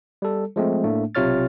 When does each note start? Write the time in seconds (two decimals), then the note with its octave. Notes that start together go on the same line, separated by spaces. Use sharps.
0.22 G3 A4
0.56 F3 G#3 A3 C4
0.84 A2 A3 A#3 D4
1.15 B1 C3 F4 C#5 F6 A6